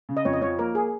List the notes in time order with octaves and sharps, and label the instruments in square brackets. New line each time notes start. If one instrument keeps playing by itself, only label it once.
[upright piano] C#3
[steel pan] D#5
[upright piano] F2 [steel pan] C#5
[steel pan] D#5
[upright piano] F3 [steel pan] C#5
[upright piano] A#3 [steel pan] A#4
[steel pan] G#4